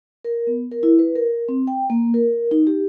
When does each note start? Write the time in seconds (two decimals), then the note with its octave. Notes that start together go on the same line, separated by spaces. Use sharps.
0.24 A#4
0.47 B3
0.72 A#4
0.83 E4
0.99 B4
1.15 A#4
1.49 C4
1.67 G5
1.90 A#3
2.14 A#4
2.51 D#4
2.67 G4